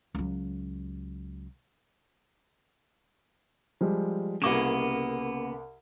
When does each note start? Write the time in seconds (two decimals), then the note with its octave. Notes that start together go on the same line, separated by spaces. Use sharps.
0.15 C#2 F#3
3.81 F3 G3 G#3
4.42 C2 C#3 A#3 B3 D6 E7